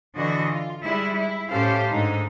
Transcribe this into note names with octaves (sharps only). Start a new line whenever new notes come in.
D3 E3 F#4 D5 D#5
F4
G3 G#3 E4
E4
A2 C#4 G4 A4 C5 F5
G#2 D3 D#4